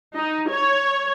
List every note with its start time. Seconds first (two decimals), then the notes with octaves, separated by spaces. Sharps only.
0.16 D#4
0.50 C#5